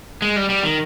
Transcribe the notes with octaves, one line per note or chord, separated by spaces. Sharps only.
G#3
G3
G3
D#3